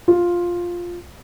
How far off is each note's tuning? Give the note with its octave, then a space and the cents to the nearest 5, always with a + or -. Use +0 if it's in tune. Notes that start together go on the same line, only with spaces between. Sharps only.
F4 +5